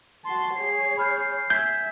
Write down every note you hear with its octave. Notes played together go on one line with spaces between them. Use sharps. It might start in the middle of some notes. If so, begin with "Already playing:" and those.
F#4 A5 C6
G#4 C#5 C7
B5 F6 G6
E5 G#5 G6 G#6 B6